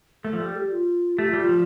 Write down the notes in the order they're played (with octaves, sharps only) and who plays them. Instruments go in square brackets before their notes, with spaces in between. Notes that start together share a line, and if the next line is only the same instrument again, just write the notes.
[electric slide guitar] A3 [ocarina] A4
[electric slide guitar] F3
G3
[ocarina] G4
F4
[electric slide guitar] A3 [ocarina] G4
[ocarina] F4
[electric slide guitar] G3
[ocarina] F4
[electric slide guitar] F3